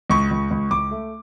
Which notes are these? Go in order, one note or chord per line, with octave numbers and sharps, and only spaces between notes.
C#2 C#6
C#2
C#2
C#2 D6
A3